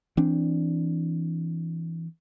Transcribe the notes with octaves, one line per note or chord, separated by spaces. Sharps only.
E3 C4 D4